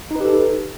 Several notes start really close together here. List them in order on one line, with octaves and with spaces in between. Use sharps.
D#4 B4 G4 A4